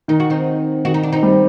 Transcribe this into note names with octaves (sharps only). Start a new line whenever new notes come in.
D#3 D#4
F#4
C4 D#4
D#3 F#4
D#4
D4
C4 D#4
G3